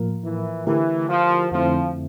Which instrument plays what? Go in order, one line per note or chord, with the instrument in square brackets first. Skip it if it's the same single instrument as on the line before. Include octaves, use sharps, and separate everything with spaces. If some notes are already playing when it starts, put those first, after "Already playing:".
Already playing: [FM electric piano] A2 F3 A#3 F4 A#4
[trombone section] E3
[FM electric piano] D3 A3 E4 G4 A#4 [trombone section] E3
[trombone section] F3
[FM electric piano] F2 D3 A3 C4 E4 [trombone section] F3